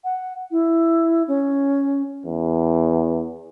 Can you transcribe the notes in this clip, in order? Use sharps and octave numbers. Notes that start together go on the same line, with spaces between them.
F#5
E4
C#4
E2